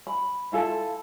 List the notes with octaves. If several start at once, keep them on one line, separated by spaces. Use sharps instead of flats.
B5
E4 F4 A4 A5